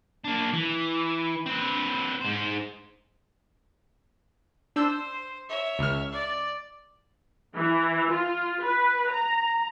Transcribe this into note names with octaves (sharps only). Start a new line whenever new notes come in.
A#3 D4
E3
C4 B4
G#2 C5
D4 C5 E6 G6
C#5 E5
C#2 F6
D5
E3
F4
B4
A#5